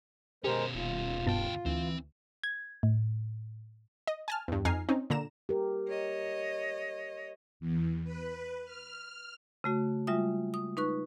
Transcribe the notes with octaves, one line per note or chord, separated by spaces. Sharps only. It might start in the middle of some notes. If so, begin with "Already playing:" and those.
B2 G#3 C#4 G4 A#4 C5
D#1 F4
D2 G2 B2 G5 A5
D2 E3 C4
G#6
A2
D#5
G#5 A5 F6
E2 G2
F2 D#4 G#5 A#5 F6 C7
C4 C#4 D#4
A#2 D3 A#5 E7
G4 A#4
C#5 D#5
E2
B4
F6
C#3 A3 F#4
G3 G#3 F4 E5 D#6
D#6
D#4 B4 C#6 F#6